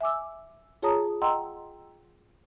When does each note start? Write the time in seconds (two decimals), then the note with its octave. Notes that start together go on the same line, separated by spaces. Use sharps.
0.01 E5 G#5 D6 E6
0.82 F4 G#4 C#5 A5 A#5 D#6
1.22 D#5 F#5 G5 A#5 C6 E6